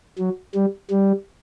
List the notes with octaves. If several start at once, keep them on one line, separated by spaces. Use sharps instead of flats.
F#3
G3
G3